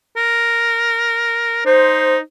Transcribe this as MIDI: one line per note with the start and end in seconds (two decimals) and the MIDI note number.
0.16 1.64 70
1.65 2.19 63
1.65 2.16 72